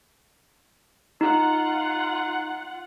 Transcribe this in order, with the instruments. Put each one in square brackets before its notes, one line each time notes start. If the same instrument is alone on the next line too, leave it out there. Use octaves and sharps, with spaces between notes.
[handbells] D#4 [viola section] F4 F#5